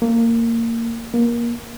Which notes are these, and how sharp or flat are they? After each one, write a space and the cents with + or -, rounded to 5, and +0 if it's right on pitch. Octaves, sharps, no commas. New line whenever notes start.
A#3 -20
A#3 +20